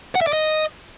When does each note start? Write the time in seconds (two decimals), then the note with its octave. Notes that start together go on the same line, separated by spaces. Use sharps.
0.15 F#5
0.21 E5
0.27 D5
0.33 D#5